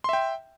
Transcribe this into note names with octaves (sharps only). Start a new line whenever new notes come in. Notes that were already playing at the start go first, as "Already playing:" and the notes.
E5 G5 C6